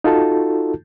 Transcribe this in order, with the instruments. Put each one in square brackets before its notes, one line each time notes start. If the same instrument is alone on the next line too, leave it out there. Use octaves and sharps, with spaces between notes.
[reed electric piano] D#4 F4 F#4 A4 A5